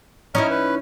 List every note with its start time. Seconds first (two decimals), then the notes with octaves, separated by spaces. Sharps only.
0.35 C#4 D#4 E4 D#5 A#5 F6
0.50 B4